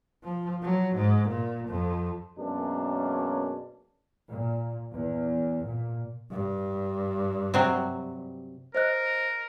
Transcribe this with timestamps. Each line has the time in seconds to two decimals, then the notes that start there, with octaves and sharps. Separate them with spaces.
0.24 F3
0.63 F#3
0.95 G#2
1.29 A#2
1.68 F2
2.38 F#2 B2 G#3 A#3 C#4 D4
4.30 A#2
4.93 E2
5.66 A#2
6.31 G2
7.54 C3 F#3 C4
8.75 A#4 C5 D#5 F#6